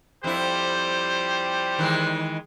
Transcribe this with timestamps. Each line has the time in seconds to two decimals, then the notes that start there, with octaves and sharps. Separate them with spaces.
0.24 F2 G3 E4 G4 C5
1.79 D#3 E3 G#3